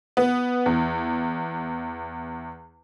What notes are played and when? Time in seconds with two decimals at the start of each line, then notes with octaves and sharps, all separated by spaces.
0.17 B3
0.66 E2